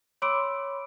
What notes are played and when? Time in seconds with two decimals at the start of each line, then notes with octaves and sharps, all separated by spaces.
0.22 C#5 B5 C6 D6 E6 D7